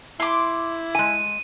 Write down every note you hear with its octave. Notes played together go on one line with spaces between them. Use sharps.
E4 C6 D6
G#3 G#5 D#7